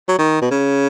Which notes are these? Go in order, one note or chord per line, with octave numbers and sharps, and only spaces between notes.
F#3
D#3
B2
C#3